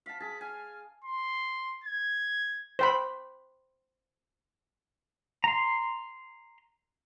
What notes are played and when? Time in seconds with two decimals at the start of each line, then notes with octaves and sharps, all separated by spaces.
0.06 F5 A5 B6
0.20 G#4 A5 B6
0.41 G#5 F6
1.04 C6
1.84 G#6
2.79 C5 G5 B5
5.44 A#5 C6